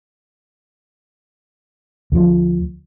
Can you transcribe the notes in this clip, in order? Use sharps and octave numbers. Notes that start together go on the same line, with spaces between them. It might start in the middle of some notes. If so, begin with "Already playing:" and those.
D2 F3